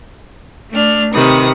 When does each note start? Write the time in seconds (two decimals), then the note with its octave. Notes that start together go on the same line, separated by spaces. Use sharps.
0.72 A3 D4 F6
1.13 C3 D#3 B4 D#6